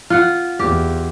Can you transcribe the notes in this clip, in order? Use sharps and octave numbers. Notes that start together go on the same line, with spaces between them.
F4 F#5
E2 G4